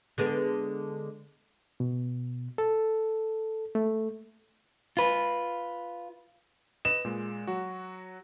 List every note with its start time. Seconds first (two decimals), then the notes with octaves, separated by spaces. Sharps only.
0.18 D3 G#3 B3
1.80 B2
2.58 A4
3.75 A3
4.97 F4 B4
6.85 B4 D#5 E7
7.05 A#2 G#3
7.47 F#3 F#4